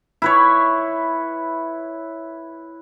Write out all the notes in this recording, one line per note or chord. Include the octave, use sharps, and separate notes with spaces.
E4 B4 C#5